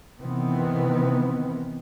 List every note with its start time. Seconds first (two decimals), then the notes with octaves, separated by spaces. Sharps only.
0.20 C3 D#3 E3 B3 C4